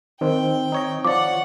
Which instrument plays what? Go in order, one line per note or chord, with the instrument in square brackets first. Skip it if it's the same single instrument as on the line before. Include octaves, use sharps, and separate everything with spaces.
[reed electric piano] D#3 C4 [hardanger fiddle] G5
[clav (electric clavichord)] D#4 C#5 D#5
[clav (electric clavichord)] F3 D5 [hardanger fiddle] C#5 F#5 [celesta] D6